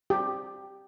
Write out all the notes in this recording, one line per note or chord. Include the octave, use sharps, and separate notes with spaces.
G4